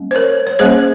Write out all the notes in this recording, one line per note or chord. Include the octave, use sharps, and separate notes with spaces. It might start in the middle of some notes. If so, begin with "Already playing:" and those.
Already playing: G3 A#3 C#4
C5
A#4 C#5
C#5
G3 A#3 C#4 G#4 C5